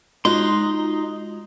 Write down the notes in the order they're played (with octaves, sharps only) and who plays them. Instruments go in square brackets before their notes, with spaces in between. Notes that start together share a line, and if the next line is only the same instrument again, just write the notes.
[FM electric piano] G#3 F4 F#4 [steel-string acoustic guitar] D#4 [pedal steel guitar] C6 F#6